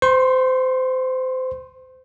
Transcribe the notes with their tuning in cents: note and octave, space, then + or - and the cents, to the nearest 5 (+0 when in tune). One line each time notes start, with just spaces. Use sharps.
C5 -25 C6 +35